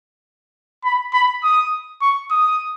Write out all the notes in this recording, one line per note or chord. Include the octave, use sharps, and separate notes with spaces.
B5
B5
D#6
C#6
D#6